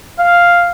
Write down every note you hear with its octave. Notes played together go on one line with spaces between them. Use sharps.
F5